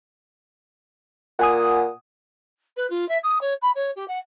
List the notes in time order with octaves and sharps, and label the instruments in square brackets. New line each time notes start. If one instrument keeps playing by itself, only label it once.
[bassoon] A#2 [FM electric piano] F#5 G#5 D#6
[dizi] B4
F4
E5
D#6
C#5
B5
C#5
G4
F#5